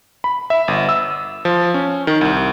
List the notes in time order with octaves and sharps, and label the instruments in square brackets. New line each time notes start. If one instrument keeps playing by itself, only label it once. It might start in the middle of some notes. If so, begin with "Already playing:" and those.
[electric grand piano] B5
E5
G1
E6
F3
C#4
D#3
C2